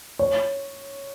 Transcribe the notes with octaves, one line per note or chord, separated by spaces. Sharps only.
C#5